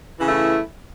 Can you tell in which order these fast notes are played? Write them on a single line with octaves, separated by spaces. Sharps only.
E3 C#3 B3 A3 E4